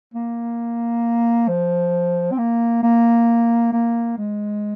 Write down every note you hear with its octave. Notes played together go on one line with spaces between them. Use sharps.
A#3
F3
C4
A#3
A#3
A#3
G#3